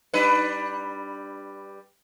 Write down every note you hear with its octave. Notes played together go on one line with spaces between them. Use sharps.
G3 D4 B4